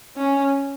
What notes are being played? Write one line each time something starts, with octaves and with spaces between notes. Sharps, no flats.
C#4